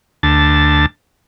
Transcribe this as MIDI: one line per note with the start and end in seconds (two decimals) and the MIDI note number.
0.23 0.86 38
0.23 0.86 81